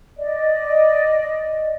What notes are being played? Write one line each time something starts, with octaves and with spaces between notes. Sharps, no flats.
D5 D#5